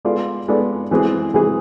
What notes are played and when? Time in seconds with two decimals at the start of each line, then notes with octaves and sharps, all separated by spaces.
0.05 G#3 B3 F4 A4 D5
0.48 G#3 B3 F4 A4 D5
0.91 E3 G#3 C4 G#4
1.34 E3 G#3 C4 G#4